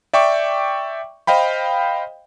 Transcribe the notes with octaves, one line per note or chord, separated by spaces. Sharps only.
D5 E5 G5 C#6 D6
C5 D#5 F5 G5 B5